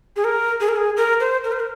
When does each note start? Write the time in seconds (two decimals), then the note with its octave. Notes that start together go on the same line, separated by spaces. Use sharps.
0.16 G#4
0.24 A#4
0.60 G#4
0.69 A#4
0.76 G#4
0.97 A#4
1.20 C5
1.44 A#4
1.52 C5
1.60 A#4